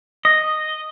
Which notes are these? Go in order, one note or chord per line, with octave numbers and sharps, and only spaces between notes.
D#5